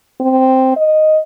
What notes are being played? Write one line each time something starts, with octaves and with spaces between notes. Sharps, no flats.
C4
D#5